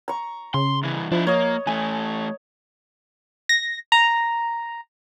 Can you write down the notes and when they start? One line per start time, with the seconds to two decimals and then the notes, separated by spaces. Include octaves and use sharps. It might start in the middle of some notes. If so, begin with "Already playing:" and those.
0.08 A#5 C#6
0.54 C#3 C6
0.83 C2 E3
1.12 F3 D4 E4
1.27 A#3 C#5 D#5
1.67 E3 A3 G#5
3.49 A#6
3.92 A#5